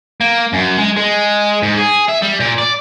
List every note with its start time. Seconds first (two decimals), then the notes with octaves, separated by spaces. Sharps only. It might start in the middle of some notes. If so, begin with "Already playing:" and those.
0.21 A#3
0.53 F#2
0.78 G#3
0.97 G#3
1.63 G#2
1.78 G#4
2.09 E5
2.23 G3
2.40 A#2
2.58 D5